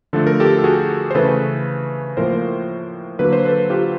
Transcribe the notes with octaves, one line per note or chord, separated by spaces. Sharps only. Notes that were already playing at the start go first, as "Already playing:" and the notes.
D3 F3 A3 A4
A#4
G4 A4
A4
F#4 G#4
C5
C#3 E3 A3 A4 B4
A2 F3 A#3 A#4 C5
D3 F#3 A#3 B4
C5
A4 B4
F4 G4